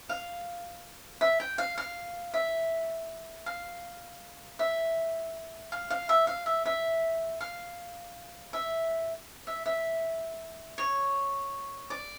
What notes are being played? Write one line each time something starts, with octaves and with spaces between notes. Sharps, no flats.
F5
E5
G5
F5
F5
E5
F5
E5
F5
F5
E5
F5
E5
E5
F5
E5
E5
E5
C#5
D5